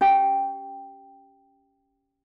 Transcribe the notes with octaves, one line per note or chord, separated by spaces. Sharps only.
C#4 G4 G5